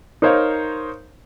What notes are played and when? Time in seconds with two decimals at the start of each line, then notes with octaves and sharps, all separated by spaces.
0.22 D#4 A#4 C5 C#5 F5